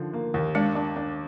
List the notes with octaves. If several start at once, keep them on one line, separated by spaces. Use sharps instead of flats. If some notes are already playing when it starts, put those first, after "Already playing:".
Already playing: D3 D#3 F3
A#3
D#2
G#3 D4
D4
D4